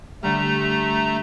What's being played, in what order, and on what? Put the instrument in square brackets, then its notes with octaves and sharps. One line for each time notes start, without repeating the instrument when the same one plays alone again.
[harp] D3 G3 [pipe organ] A3 A#5